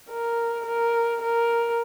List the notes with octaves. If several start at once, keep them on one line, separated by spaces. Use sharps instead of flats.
A#4
A#4
A#4